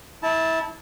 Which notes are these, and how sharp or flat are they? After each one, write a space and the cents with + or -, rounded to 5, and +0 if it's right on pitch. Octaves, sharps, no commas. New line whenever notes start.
E4 -25 A5 +0